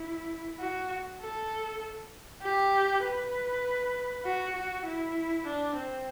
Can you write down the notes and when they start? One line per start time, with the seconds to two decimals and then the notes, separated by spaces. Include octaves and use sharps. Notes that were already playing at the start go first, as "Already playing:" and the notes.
Already playing: E4
0.60 F#4
1.20 A4
2.42 G4
3.04 B4
4.25 F#4
4.55 F#4
4.86 E4
5.46 D4
5.77 C4